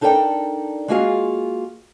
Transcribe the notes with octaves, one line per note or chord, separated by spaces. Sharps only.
D4 D#4 A4 A#4 D5 G5
G#3 A#3 F4 F#4 G#4 F5